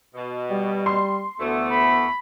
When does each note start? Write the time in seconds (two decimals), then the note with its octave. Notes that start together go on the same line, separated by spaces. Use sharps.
0.15 B2
0.50 G3
0.86 C6
1.40 D2 E3 A3 B3
1.71 B5